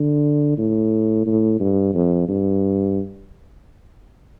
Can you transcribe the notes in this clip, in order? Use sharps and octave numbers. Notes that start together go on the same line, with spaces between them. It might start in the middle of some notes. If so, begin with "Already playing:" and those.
Already playing: D3
A2
A2
G2
F2
G2